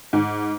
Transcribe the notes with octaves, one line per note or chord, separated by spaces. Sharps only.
G#2